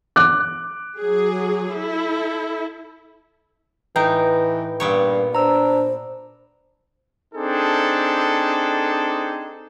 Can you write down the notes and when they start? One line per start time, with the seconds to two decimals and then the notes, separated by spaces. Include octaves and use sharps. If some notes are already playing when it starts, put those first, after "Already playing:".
0.16 D6 F#6
1.00 F#3 G#4
1.80 E4 A4
3.96 A2 E3 D#4 B4 G5 G6
4.80 G2 A#2 B3 C#5
5.35 D4 C5 A#5 E6
7.34 C4 D4 D#4 G#4 A4